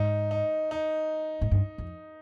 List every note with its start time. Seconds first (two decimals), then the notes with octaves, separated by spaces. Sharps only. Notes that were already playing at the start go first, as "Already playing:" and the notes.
Already playing: G#2 D#4
0.31 D#4
0.71 D#4
1.41 G#2
1.51 G2
1.78 F2